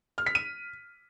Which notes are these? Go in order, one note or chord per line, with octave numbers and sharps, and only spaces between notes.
F6
B6
D#7